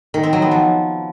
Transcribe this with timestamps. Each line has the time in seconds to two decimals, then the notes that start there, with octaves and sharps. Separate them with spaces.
0.14 D#3
0.23 C4
0.33 F#3
0.42 B3
0.51 F3